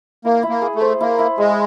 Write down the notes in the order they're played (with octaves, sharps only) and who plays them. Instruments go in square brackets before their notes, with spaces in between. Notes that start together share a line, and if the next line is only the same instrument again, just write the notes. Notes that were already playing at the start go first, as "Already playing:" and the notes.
[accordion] A#3 [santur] E4
[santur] E4
[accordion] A#3
[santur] G#4
[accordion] A3
[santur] C5
[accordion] A#3 [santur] E4
[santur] E4
[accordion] G#3 [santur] G#4